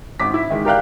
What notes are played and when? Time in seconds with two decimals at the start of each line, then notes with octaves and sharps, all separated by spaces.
0.20 G#1 D6 B6
0.34 E4
0.50 D#3 G#3
0.65 G4 A#4 D5 F5 G5 F#6